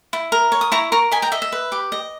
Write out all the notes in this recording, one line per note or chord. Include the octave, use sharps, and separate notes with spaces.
E4
A#4
C#5
D#6
E4 A#5 C#6
A#4 A#5 C#6
D#5 G#5 B5
G5 A#5
D#5 E5
E5
B4
G4
D#5